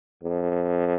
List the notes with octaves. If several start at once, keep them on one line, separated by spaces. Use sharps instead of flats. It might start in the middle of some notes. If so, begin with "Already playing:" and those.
F2